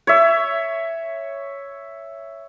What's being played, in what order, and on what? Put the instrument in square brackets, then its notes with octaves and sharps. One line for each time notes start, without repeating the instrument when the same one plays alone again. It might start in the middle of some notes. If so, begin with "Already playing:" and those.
[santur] C#5 E5